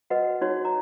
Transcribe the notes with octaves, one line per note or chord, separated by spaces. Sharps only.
F#4 B4 D#5 F#5
D#4 F#4 C#5
A#5